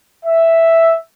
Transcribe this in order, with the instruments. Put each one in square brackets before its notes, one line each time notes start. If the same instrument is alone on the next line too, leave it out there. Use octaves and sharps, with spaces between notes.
[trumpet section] E5